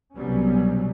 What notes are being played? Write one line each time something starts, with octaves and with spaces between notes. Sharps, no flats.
C2 B2 F#3 G3 B3 C#4